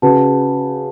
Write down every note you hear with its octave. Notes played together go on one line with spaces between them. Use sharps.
C#3 F#4 B4 F#5 A5